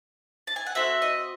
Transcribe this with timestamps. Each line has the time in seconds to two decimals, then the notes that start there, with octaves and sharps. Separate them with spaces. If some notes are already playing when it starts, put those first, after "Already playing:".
0.47 A5
0.56 G#5
0.66 F#5
0.75 C4 F#4 A4 E5
1.02 D#5